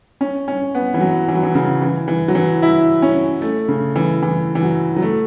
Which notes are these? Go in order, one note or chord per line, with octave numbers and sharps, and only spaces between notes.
C#4
C#4
B3
E3
F#3
E3
F#3
E3
C#3
E3
E3
F#3
E3
E4
C#4
A3
C#3
E3
E3
E3
F#3
F#3
A3